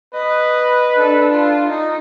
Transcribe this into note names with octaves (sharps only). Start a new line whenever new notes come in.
B4 D#5
D4 A4
F4
D#4